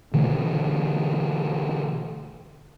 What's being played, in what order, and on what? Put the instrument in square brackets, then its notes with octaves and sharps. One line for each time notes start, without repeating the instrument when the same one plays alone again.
[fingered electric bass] B2 D3 E3 A3